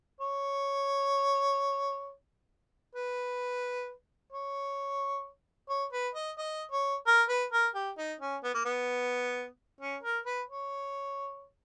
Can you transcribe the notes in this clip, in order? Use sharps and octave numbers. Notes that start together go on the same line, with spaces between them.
C#5
B4
C#5
C#5
B4
D#5
D#5
C#5
A#4
B4
A#4
G4
D#4
C#4
B3
A#3
B3
C#4
A#4
B4
C#5